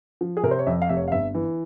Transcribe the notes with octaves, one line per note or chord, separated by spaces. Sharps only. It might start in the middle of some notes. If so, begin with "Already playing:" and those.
F3
G#4
C3 A#4
C5
C#5
F2 E5
F5
F1 E5
C#5
F5
G1 E5
E3